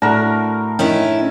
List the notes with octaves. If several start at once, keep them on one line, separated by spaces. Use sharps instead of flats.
A2 D4 F#4 A#4
D#3 C#4 D4 E4